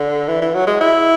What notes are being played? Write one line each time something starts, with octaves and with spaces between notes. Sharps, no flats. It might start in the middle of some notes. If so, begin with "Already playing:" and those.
Already playing: D3
E3
E3
F#3
G#3
E4